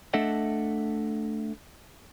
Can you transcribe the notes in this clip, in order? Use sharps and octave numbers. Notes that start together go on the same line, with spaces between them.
A3 D4 A4 D#5 E5 F#5